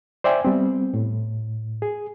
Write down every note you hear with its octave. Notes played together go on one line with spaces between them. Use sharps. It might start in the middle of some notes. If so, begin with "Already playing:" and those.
C5 D5 E5 G5 G#5
G3 B3 C4
A2
G#4